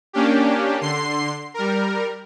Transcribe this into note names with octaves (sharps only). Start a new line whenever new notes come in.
A#3 C#4 D4 G4
D3 C6 C7
G3 A#4